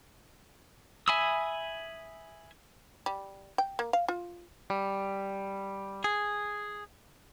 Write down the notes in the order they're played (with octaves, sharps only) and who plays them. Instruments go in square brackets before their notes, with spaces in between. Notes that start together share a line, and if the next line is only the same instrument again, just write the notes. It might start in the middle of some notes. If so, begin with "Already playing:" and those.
[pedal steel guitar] E5 G#5 B5 D#6 E6
[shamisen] G3
G5
A#3
F5
F4
[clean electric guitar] G3
G#4